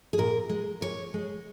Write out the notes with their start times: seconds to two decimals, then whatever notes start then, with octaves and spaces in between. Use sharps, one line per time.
0.13 G#4
0.18 A#2 A#4
0.49 G#3
0.81 A#2 C#5
1.14 G#3